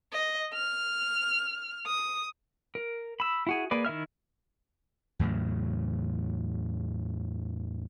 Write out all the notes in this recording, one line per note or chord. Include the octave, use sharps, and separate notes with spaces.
D#5
F6
D#6
A#4
B5 E6
E4 F#4 G#4
A#3 G#4 B4 D5
D#3 E4 E5 F6
E2 A2 C#3 F#3